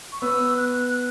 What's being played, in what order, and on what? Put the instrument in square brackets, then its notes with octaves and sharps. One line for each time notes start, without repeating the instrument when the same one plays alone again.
[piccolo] C#6
[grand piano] B3 [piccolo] E6
[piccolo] F#6